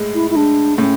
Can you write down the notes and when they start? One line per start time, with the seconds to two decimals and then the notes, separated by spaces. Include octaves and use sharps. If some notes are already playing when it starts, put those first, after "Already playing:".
Already playing: A2 G#3
0.14 E4
0.30 E4
0.35 G#3 D4
0.78 A2 C#4